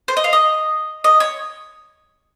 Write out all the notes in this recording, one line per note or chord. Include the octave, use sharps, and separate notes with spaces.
C5
D#5
F5
D#5
D#5
C#5